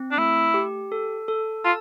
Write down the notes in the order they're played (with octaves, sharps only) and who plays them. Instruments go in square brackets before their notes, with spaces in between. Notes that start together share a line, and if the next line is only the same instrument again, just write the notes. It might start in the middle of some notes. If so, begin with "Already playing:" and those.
Already playing: [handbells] C4
[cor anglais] D4
[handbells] A3 [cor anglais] E4
[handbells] G4
A4
A4
[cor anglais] F4 [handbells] A5